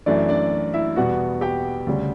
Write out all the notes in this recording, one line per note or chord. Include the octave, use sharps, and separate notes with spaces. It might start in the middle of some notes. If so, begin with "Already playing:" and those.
F#2 E3 A3 D4 D5
D4 D5
E4 E5
E2 B2 G3 B3 F#4 F#5
G4 G5
D2 C#3 G3